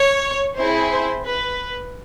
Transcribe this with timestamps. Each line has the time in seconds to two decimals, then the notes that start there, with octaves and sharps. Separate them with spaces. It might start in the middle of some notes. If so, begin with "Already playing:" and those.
Already playing: C#5
0.56 C4 E4 G#4 C5
0.91 C5
1.25 B4